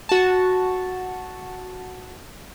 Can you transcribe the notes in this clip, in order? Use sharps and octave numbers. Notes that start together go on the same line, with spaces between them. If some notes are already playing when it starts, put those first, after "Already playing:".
F#4 A5